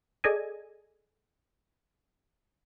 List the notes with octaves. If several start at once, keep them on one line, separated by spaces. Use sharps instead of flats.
G#4 A4 D5 D#5 G#5